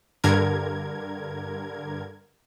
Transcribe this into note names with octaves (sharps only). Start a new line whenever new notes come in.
G2 D3 A#4 G#6